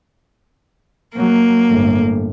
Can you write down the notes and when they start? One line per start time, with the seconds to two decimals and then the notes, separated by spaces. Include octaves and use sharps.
1.16 F#3 A#3
1.67 G1 A2